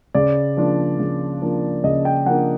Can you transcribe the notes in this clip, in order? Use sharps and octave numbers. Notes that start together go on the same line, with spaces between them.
C#3 D5
F3 A#3 D4
C#3
F3 A#3 D4
C#3 D#5
G5
F3 A#3 D4 F#5